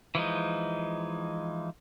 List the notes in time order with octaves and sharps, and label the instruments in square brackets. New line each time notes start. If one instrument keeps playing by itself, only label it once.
[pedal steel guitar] E3 F3 G#3 D#4